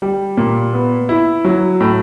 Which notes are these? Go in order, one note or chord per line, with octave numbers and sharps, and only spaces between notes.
G3
A#2
B3
E4
F#3
A2